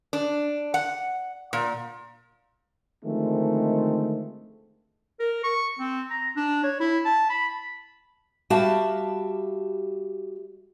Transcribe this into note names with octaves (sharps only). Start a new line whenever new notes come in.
D4
F#5
A#2
D3 D#3 F3 G#3 A3 C4
A#4
C#6
C4
A#5
D4
C#5
E4
A5
B5
G3 F#4 G4 E5 F5 A5